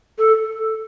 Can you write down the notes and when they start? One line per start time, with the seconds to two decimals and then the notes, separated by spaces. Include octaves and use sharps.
0.18 A4